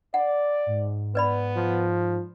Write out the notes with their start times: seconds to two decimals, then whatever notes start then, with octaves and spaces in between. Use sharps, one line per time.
0.14 D5 F#5
0.66 G#2
1.15 B3 B4 D5 B5
1.56 F3